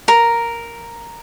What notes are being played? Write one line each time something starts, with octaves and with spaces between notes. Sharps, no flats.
A#4